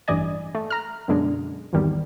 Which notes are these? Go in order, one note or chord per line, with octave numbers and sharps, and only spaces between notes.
A1 G2 E3 D5 D#5 G#5
A3
A#5 F6
F#2 B2 D3 G#3
G#1 E2 D#3 G3